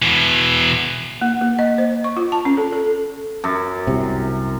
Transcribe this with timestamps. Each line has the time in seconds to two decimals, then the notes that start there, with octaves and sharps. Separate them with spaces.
0.02 B2 E3
1.21 A#3
1.41 A#3
1.59 D#5
1.78 C5
2.04 C#6
2.17 F4
2.32 A5
2.45 C#4
2.57 A4
2.73 A4
3.44 F#2
3.87 C2 C3